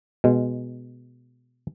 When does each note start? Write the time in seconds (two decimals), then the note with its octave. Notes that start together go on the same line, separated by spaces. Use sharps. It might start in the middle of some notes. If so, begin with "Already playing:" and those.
0.24 B2 G#3